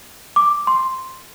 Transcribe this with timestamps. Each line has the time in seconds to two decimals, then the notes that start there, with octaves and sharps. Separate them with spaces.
0.36 D6
0.67 C6